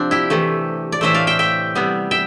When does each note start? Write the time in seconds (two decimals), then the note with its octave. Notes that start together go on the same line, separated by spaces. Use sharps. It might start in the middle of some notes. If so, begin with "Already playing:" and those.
Already playing: C3 F3 C4 D4
0.11 E4 G4
0.30 C3 E3 A3
0.92 D5
1.01 A2 E3 A3 C5 E5
1.14 D5 F5
1.27 E5 G5
1.39 E5 G5
1.75 C3 G3 B3
2.11 E5 G5